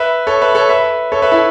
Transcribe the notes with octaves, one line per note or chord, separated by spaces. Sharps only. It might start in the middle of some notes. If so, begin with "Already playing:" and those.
Already playing: B4 E5
A4 C#5
B4 E5
A4 C#5
B4 E5
A4 C#5
B4 E5
E4 A4